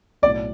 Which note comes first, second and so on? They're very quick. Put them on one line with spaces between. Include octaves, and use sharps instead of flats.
B1 D5 A2